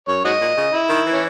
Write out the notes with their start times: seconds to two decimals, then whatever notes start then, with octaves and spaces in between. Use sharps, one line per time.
0.08 F#2 C#5
0.24 G#2 F#4 D#5
0.41 A#2
0.57 C#3
0.74 E4
0.89 D#3
1.07 E3
1.13 C#4